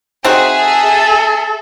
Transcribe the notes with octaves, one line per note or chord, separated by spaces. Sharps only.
C4 D#4 F#4 G#4 E5
A4